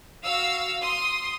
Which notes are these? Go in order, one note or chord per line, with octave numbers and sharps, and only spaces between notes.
F#4 F5 E6
C6 D#6